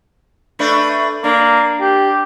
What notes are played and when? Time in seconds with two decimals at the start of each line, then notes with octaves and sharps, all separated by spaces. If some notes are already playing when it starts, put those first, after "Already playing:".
0.59 A3 D4 B4
1.24 A#3 D4
1.82 G4